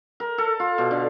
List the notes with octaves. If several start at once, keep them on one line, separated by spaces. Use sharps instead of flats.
A#4
A4
F4
B2
D3